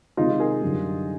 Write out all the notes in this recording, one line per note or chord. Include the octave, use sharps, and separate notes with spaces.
C3 D#3 G#3 D#4 F4
G#4 A#4
F#2 D3 G3